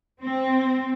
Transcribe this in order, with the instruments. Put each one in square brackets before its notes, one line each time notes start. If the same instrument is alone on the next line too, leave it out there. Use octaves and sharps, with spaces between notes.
[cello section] C4